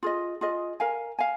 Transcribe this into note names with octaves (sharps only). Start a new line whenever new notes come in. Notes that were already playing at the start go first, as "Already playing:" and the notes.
F4 G#4 D#5
F4 G#4 D#5
A#4 F5 G#5
F5 G#5